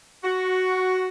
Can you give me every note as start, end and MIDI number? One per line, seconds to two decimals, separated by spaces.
0.24 1.07 66